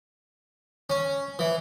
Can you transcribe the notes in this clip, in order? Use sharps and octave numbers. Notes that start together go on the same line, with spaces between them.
C#4
E3